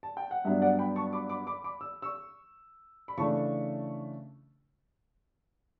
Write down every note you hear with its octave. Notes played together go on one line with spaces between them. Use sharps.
A5
G5
F#5
G2 F#3 B3 D4 E5
D5 F#5
G5 B5
A5 C#6
B5 D6
B5 D6
B5 D6
B5 D6
E6
C#6 E6
B5
C#3 E3 A3 D4 A5 C#6